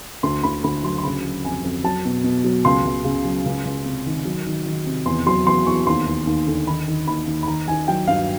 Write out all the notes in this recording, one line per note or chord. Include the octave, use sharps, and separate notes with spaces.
D2 C6
D2 B5
D2 B5
F#3 C6
C6
C#3 B5
F#3
F2 G#5
F2
F#3 A5
B2
B2
F#3
C#2 C6
C#2
C#3
F#3
C#2
C#2
C3
D#3
F#3
D#3
D#3
C3
E2 C6
F#3 C6
E2 C6
E2 C#6
D#2 C6
D#2
D#2
D3
D#3 B5
D#3
D#2 B5
D#2
B5
D#3 A#5
D#3 G#5
F#3 G5
G2 F5